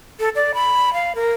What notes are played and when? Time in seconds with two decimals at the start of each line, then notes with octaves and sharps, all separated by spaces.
0.20 A4
0.36 D5
0.54 B5
0.94 F5
1.15 A#4